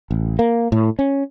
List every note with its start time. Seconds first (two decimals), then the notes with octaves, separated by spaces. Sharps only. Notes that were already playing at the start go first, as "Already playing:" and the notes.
0.11 A1
0.39 A#3
0.72 A2
0.99 C#4